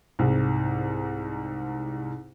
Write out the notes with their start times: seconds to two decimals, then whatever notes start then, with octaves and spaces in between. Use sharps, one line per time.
0.19 C2 G#2